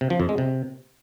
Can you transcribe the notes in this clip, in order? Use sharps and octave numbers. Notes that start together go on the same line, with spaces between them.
C3
F3
F2
G#3
C3